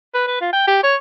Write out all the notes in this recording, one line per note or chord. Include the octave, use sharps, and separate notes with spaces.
B4
B4
F4
G5
G4
C#5